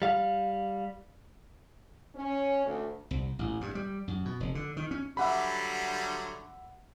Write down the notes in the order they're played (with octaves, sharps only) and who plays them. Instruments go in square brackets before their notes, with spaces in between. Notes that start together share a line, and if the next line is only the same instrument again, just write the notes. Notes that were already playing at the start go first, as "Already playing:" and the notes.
[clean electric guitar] G3 F5
[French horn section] C#4
D2
[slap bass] C2
A1
G2
G3
F#2
B2
F1
D3
D#3
C#4
[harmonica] D3 F#3 G3 [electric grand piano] E5 F#5 B5